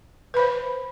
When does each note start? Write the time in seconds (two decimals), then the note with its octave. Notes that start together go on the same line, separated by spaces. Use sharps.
0.34 B4
0.37 B5
0.39 C5